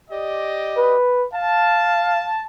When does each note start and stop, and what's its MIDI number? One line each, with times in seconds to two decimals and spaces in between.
0.10 0.95 67
0.10 0.95 74
0.10 0.95 75
0.77 1.26 71
1.33 2.32 77
1.33 2.45 81